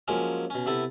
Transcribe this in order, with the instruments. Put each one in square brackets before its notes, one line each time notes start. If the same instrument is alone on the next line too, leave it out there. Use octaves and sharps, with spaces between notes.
[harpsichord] F3 F#3 G#3 A#3 C#4
B2 C#4
C3 B3 E4 A4